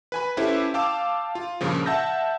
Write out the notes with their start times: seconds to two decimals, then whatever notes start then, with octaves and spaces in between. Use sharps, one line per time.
0.12 B4 G#5 B5
0.37 C#4 E4 G4 A4 B4 C5
0.74 F5 G5 A5 D6 E6
1.35 F4
1.61 G2 A#2 C#3 F3
1.86 E5 F#5 A5 E6 G6 A#6